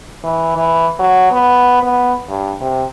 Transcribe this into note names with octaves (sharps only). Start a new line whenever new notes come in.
E3
E3
F#3
B3
B3
G2
C3